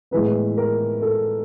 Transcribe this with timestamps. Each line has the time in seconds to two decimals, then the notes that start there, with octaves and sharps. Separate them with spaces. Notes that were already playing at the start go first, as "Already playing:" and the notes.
0.11 A2 E3 G#3 B3 B4
0.57 A#4
1.02 A4